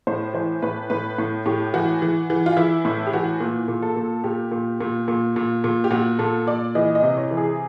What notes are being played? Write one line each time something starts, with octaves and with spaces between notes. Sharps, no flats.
A2 C5
E3 C5
A2 B4
A2 B4
A2
A2 G4
E3 F#4
E3
E3
F4
E3 E4
A2 E4
G4
E3 F#4
A#2
A#2
A4
A#2
A#2 G4
A#2
A#2
A#2
A#2
A#2
G4
A#2 F#4
A#2 A4
A#2 D5
E3 D#5
D#5
C3
C#5
E3
G#4